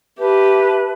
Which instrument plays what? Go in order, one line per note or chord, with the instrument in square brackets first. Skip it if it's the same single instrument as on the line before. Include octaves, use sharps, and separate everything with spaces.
[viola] G4 [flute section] B4 E5 A5